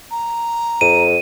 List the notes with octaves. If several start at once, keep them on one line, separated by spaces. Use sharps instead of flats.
A#5
F2 D#7